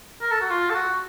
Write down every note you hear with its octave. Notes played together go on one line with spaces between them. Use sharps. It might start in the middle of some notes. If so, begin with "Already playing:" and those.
A#4
A4
F#4
F4
A4
F#4